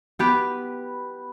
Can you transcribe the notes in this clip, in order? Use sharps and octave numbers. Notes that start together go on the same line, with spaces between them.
B3 G4 B4